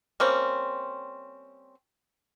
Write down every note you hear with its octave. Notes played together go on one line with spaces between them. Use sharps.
G3 A#3 C4 C#4